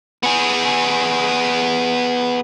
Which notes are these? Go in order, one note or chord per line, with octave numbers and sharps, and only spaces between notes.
B3 G#4